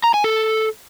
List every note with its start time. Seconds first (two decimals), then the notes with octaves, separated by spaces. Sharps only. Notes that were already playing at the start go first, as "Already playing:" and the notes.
0.04 A#5
0.14 G#5
0.24 A4